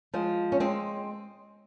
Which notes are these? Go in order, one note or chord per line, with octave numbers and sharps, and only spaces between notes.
F3 G#3
C#4
G#3 C4